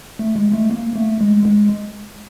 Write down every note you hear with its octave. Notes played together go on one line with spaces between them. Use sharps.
A3
G#3
A3
A#3
A3
G#3
G#3